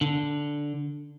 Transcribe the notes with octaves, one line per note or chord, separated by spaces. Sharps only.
D3